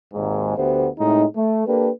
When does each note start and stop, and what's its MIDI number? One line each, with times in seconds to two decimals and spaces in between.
0.14 0.54 32
0.14 0.54 39
0.14 0.54 44
0.57 0.88 38
0.57 0.88 57
0.57 0.88 59
0.57 0.88 67
0.57 0.88 72
0.98 1.24 45
0.98 1.24 48
0.98 1.24 56
0.98 1.24 63
1.37 1.63 57
1.66 1.90 58
1.66 1.90 62
1.66 1.90 67
1.66 1.90 69
1.66 1.90 71